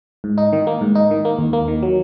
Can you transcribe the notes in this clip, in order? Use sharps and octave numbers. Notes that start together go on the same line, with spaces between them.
G#2
D#4
D#3
A#3
G#2
D#4
D#3
A#3
D#2
A#3
D#3
F#3